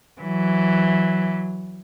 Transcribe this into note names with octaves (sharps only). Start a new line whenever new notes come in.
E3 F#3